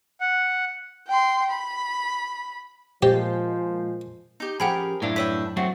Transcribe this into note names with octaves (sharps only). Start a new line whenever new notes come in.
F#5
G5 C6
B5
A#2 F3 G#3 G4 C5
D#4 G4
F3 C#4 G4 G#4 A#4 F#5 G5 B5
F#2 A2 D4 E4 F5
B4 C#5 E5 G5 B6
F#3 A3 C4 F#4